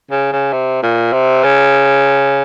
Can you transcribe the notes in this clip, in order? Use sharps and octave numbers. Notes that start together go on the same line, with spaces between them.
C#3
C#3
C3
A#2
C3
C#3